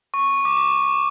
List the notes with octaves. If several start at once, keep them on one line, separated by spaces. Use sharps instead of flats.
C#6
D6
D6